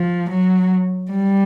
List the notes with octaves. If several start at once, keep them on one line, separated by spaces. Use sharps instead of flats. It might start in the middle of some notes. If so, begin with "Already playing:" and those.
Already playing: F3
F#3
G3